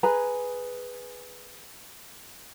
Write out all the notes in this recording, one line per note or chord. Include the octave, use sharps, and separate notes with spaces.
G#4 B4 G#5 A#5